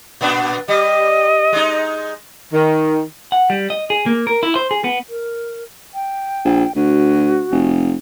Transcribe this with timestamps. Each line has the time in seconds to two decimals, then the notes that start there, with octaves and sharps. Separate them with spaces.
0.21 A#2 B3 D4
0.68 G3 D#5
1.52 G#3 D#4
2.54 D#3
3.32 F#5
3.50 G3
3.70 D#5
3.90 G#4
4.06 A#3
4.27 A#4
4.43 E4
4.55 C5
4.71 G#4
4.84 B3
5.09 A#4
5.94 G5
6.45 A#1
6.75 D2 F#4
7.51 F1